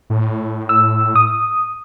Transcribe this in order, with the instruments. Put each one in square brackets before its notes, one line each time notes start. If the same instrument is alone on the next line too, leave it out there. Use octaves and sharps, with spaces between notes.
[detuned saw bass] A2
[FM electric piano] E6
D#6